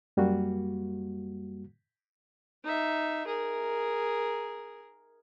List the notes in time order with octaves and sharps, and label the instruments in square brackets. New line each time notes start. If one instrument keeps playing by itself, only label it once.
[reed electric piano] F#2 G3 A#3 F#4
[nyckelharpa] D#4 E5
G#4 A#4